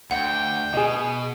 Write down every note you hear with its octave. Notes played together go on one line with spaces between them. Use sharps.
D2 F#5 G5
B2 G#4 D#5